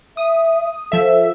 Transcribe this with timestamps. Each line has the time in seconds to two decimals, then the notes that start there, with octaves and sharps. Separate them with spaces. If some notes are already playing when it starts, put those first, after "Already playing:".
0.17 E5 D#6
0.92 F3 A4 E5